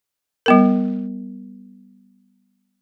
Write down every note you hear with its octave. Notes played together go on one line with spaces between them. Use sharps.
G3 B3 A#4